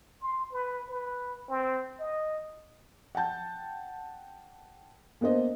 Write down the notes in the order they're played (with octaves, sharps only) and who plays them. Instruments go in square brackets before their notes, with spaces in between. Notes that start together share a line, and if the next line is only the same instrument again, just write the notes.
[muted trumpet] C6
B4
B4
C4
D#5
[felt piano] F#5 G5 A5 G6
A#3 B3 D4 C5 D#5